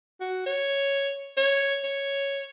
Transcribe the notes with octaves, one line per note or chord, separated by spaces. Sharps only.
F#4
C#5
C#5
C#5